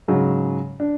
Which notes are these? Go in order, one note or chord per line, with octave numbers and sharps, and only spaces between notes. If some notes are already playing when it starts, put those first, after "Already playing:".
G#2 C#3 F#3
D4